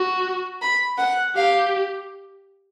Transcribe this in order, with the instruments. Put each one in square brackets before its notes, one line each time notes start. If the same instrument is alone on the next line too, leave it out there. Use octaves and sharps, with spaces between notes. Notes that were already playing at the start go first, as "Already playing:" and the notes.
Already playing: [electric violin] F#4
[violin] B5
F#5
[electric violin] G4 [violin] F5